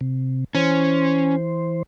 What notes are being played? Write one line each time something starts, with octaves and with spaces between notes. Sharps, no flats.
C3
E3 C#4 C5